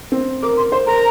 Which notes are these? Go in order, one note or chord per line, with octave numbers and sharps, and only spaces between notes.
C4
A#4 D6
C6
C5 C6
A#4 A#5